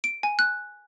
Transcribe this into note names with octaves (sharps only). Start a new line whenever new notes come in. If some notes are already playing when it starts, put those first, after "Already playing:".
D7
G#5
F#6